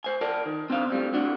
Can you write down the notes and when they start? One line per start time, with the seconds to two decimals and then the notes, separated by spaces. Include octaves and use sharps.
0.04 C5 G#5
0.21 A#4 D5 A5
0.46 D#3
0.70 C4 D4 C5 F5
0.90 A2 G3 C4
1.14 A2 D4 F#4